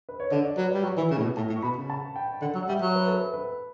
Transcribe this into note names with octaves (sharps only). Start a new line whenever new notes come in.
B4
C#5
D3 D5
D5
F#3 B4
G3 D5
F#3 C#6
E3
C#3 C#6
A2
B2
A2 A5
A2
C#6
B2 B5
C#3
A5
G5
D3 F#5
F#3
F#5
G3 E5
F#3
B4
A4
B4
B4